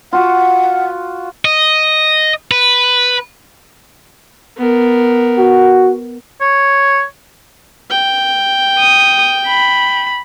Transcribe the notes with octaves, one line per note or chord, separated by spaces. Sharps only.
F4 F#4 F#5
D#5
B4
B3 A#4
F#4
C#5
G5
D#6
B5